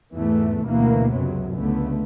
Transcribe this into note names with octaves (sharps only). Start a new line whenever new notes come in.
E2 G#2 E3 A3
D2 B2 E3 A#3 B3
C#2 F#2 C3 F#3
C#2 D3 A3 B3